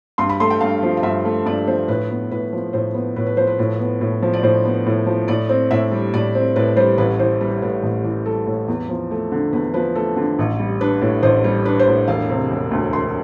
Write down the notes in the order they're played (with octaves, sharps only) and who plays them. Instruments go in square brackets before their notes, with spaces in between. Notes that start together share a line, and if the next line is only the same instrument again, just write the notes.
[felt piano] G2 C6
B5
A3 C6
G5
G2 F5
F3
F5
G2 E5
A3
G2 D5
F3 C5
A2 B4
B3
A2 B4
F3
A2 C5
B3
A2 B4
B4
F3 C5
B4
A2
B3
A2
F3
D5
A2 C5
B3
A2
F3
A2 D5
C4
A2 E5
G3
A2 D5
C4
A2 B4
G3 C5
A1 B4
E3 C5
G3 B4
A2 B4
A1
E3
G3 A4
A2
E2
F3
A3
D3
E2 B4
F3 B4
A3 A4
D3
A1
G3
D4 B4
A2
A1 C5
G3
D4 B4
C5
A2
E1 F5
C3
E1
D2
E1 C6